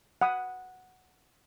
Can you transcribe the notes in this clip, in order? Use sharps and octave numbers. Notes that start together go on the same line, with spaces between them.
F#5 B5 D#6